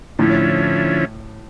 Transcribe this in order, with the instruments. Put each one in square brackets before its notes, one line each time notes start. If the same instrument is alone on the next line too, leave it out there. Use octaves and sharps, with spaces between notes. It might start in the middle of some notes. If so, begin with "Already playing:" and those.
[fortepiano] A2 [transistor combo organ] D3 F3 C#4 E4